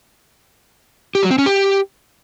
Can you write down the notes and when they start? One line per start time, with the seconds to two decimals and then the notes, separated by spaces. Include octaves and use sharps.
1.15 G4
1.23 F#3
1.31 C4
1.38 C#4
1.46 G4